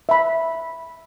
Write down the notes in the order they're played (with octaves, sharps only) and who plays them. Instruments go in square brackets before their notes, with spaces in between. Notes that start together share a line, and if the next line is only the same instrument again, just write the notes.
[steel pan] E5 B5